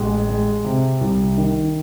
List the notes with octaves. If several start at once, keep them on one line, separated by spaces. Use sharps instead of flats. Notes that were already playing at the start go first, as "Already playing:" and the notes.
Already playing: A1 G#3
G#3
C3
C2
D#3